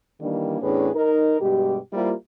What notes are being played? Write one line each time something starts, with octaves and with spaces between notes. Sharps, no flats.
D#3 E3 G3 A#3 D4
E2 A2 C#4 D4 G#4 B4
D#4 A#4
G2 B2 G#3 G4
G3 A#3 E4 F4 G4 C5